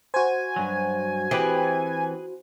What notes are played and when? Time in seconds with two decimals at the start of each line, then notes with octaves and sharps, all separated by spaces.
0.14 F#4 C5 G#5
0.56 G2 F#3
1.31 E3 C4 G4 G#4 B4